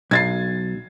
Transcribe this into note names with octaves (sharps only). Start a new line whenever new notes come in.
B1 G#6 A6 C7